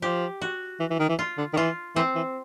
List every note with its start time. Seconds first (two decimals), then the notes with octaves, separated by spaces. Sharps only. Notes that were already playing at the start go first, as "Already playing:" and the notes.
0.02 F3 G4
0.42 F#4
0.80 E3
0.91 E3
0.99 D#3
1.09 E3
1.19 F4
1.38 D3
1.53 D#3
1.57 E3 F4
1.96 E3 C4
2.15 E3